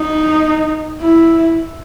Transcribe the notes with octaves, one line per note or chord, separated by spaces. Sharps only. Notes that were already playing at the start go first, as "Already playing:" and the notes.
Already playing: D#4
E4